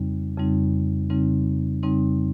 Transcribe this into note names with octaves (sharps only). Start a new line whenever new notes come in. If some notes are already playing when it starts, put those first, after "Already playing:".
Already playing: F2 C#3 G3 C4 D#4
F2 C#3 G3 C4 D#4
F2 C#3 G3 C4 D#4
F2 C#3 G3 C4 D#4